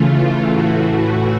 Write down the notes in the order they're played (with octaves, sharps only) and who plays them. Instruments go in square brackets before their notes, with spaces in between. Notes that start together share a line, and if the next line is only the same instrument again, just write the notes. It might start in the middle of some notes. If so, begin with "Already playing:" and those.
Already playing: [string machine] C#3 E3 A3 F4
F4
A2 E3 A3 F#4